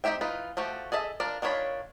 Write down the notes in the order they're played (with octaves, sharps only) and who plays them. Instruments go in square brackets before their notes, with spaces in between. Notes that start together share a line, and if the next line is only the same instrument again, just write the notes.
[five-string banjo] C4 D#4 G4 E5 G5
E3 D#4 F4 B4
F3 A3 F#4 G4
G#4 A4 D#5 E5
D4 F4 A#4 D5
D#3 D4 F4 C#5 B5